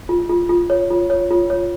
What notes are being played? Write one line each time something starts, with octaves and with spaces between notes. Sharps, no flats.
F4
F4
F4
C#5
F4
C#5
F4
C#5